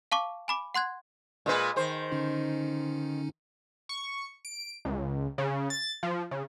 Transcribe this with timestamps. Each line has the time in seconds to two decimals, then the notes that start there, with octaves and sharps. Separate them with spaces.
0.12 F5 A5 C#6 D6
0.48 G#5 B5 D6
0.75 F#5 C6 F#6 G#6
1.46 A#2 G#3 B4
1.76 D#3 C5
2.12 D3 C#4 D#4
3.89 C#6
4.45 D7
4.85 C#2
5.38 C#3
5.70 A6
6.03 F3
6.31 C#3